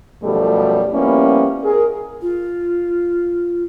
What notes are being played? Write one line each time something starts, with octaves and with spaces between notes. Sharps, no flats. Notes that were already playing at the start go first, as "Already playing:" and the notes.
F#2 B2 F3 G3 A3 A4
F3 G3 A#3 B3 C#4 E4
G#4 A#4
F4